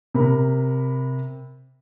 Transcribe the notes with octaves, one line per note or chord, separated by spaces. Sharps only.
C3 A#4 B5